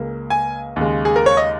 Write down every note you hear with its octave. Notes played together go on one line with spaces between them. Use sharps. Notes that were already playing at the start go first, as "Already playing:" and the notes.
Already playing: C#2 C#3 A#3
G#5
D#2 C#3 G#3
G#4
A#4
C#5
D#5